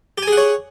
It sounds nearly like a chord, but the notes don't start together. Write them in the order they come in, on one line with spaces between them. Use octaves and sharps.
G4 G#5 G#4 F#5 C#5